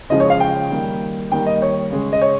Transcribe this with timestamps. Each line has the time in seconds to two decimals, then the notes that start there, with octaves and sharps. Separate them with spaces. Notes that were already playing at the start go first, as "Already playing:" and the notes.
0.10 C#3 F3 G#3 D#5
0.20 C#5
0.30 F5
0.40 G5
0.70 D#3 G3 A#3
1.32 D#3 G3 A#3 G5
1.46 D#5
1.62 C#5
1.91 C#3 G#3
2.13 D#5
2.22 C#5